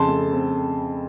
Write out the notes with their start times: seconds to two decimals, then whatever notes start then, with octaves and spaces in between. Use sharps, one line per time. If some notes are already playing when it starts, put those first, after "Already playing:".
Already playing: F2 C#3 A5 C6
0.08 A3
0.32 C4